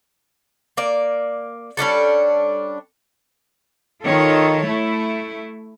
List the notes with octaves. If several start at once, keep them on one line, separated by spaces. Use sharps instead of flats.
A#3 D5
G3 C#4 D4 A4
D#3 F4 A4 C#5
A3 E4